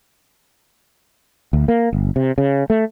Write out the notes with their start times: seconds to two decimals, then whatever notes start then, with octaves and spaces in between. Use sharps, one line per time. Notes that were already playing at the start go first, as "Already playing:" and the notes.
1.53 D2
1.68 A#3
1.93 G1
2.16 C3
2.38 C#3
2.70 A3